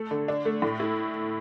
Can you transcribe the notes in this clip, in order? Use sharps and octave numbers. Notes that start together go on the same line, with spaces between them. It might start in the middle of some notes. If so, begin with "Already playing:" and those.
Already playing: A3 A4
D3
D4
A3
A2
E4